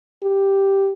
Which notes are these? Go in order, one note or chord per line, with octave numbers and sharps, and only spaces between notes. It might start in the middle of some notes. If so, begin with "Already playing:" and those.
G4